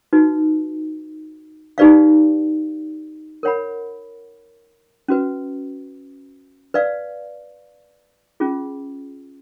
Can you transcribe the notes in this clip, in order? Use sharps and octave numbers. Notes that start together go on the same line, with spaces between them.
D#4 F#4 B4
D#4 G4 B4 D5 F5
A#4 C#5 F#5 B5
C#4 F#4 B4
B4 D5 F5
C#4 F4 G#4